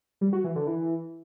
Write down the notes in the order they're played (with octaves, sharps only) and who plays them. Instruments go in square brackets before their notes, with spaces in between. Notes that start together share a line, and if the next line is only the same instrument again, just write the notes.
[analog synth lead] G3
F#4
E3
D3
E3